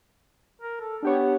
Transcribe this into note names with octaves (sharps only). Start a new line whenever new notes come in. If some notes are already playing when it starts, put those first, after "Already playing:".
A#4
A4
B3 D4 G4 C#5